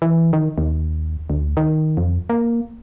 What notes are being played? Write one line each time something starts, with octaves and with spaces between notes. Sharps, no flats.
E3
D#3
D#2
D2
D#3
F2
A#3